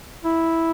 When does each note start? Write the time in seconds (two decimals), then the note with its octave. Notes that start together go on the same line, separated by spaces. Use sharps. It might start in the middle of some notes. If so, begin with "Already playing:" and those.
0.24 E4